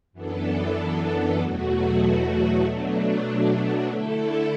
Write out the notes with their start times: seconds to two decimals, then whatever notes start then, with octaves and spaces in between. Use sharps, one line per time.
0.12 F#2 E3 B3 D4 A4
1.38 E2 B2 F#3 A3 F#4
2.64 B2 F#3 A3 D4
3.89 D3 A3 E4 A4